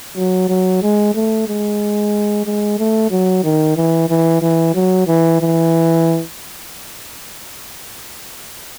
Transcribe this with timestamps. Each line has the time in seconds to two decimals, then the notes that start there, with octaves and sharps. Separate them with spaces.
0.17 F#3
0.49 F#3
0.82 G#3
1.15 A3
1.48 G#3
2.46 G#3
2.79 A3
3.11 F#3
3.44 D#3
3.76 E3
4.09 E3
4.42 E3
4.75 F#3
5.07 E3
5.41 E3